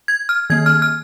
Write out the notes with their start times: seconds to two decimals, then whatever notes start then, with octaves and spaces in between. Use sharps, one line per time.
0.08 G#6
0.29 F6
0.50 D#3 A#3 G#6
0.66 F6
0.82 F6